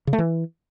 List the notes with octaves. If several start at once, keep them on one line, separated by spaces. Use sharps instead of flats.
C#3
A3
E3